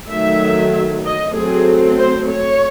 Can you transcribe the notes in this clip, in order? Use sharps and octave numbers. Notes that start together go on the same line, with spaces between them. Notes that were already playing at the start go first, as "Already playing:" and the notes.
D#3 F#3 A3 E5
D#5
F#3 A3 C4 G#4
C5
C#5